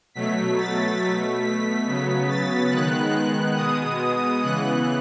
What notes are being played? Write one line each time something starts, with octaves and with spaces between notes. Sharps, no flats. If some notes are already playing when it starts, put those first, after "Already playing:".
B2 F#3 A3 B6
A6
B2 A3 B6
B6
C#3 F#3 B3
A6
D#3 G#3 B3 F#6
F#6
B2 G#3 B3 D#6
C#3 E3 B3 F#6